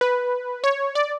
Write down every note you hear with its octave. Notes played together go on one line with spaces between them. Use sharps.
B4
C#5
D5